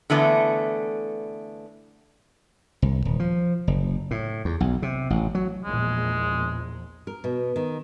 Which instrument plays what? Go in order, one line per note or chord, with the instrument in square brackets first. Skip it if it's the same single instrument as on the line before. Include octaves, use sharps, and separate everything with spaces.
[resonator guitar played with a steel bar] D3 E3 A3 B3
[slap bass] C2
D#1
F3
F#1
A2
E2
B1
C3
A1
F#3
[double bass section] A#1 E2 A#2 [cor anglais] G#3
[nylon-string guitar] A#4
B2
D#3